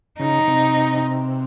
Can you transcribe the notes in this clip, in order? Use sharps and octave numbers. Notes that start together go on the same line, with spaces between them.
C#3 D#4
C3